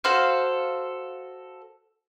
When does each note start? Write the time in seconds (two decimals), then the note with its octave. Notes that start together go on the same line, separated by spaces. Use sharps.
0.04 F#4 A4 C5 F5